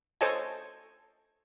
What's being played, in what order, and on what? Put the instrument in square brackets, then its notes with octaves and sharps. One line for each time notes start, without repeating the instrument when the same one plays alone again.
[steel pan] A4 C5 C#5 D#5 G#5 A5